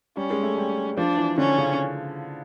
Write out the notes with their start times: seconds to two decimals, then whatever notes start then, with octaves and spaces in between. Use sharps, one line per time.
0.17 G3 C#4
0.30 G#3
0.43 A3
0.58 G3
0.97 F3 D4
1.17 E3
1.38 D3 C#4
1.58 C#3